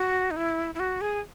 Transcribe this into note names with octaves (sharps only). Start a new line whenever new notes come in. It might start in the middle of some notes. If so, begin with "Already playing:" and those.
Already playing: F#4
D#4
E4
E4
F#4
G#4